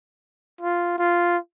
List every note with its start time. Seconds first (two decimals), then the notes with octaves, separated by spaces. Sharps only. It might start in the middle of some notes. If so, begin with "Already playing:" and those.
0.61 F4
0.98 F4